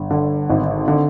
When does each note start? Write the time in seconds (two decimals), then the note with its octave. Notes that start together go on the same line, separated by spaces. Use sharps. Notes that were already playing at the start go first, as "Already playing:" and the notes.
Already playing: G1
0.11 D3
0.50 G#1
0.88 D3